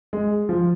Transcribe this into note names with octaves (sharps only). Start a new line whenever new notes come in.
G#3
F3